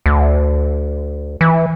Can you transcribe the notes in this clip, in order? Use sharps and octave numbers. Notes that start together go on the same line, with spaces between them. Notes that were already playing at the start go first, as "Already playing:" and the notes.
D2
E3